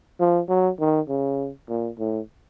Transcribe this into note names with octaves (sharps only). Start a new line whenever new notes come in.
F3
F#3
D#3
C#3
A#2
A2